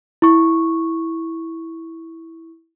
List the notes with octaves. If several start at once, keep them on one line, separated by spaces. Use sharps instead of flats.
E4 C#6